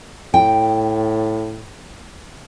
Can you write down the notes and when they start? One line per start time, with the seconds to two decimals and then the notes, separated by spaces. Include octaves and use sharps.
0.34 A2 G5